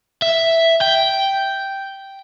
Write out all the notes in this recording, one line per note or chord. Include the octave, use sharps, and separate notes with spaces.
E5
G5